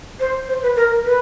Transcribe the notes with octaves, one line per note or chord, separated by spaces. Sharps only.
C5
C5
B4
A#4
B4